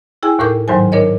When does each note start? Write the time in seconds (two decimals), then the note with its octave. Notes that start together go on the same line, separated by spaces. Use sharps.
0.23 E4 G#4 G5 G#5
0.39 D#2 A2 A#4 D6 G6
0.68 D#2 G#2 D#3 F#3 C5 G#5
0.92 D4 A#4 C#5 D#5